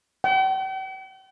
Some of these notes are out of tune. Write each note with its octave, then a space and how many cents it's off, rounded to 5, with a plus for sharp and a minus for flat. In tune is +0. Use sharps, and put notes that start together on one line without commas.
G5 -45